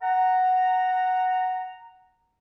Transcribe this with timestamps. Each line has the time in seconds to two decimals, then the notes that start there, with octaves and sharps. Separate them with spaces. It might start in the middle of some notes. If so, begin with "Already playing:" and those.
0.02 F#5 A#5